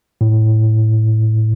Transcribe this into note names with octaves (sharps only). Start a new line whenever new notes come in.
A2